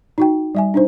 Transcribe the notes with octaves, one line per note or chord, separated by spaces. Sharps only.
D#4 F#4 G5
G3 E5 G#5
D4 D#4 C5